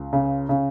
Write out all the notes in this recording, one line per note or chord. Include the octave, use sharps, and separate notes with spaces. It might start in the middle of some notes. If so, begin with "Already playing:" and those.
Already playing: C#2
C#3
C#3